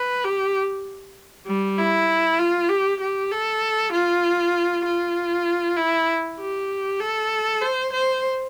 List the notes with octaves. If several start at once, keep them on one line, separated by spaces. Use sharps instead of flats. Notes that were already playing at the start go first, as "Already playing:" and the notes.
Already playing: B4
G4
G3
E4
F4
G4
G4
A4
F4
F4
E4
G4
A4
C5
C5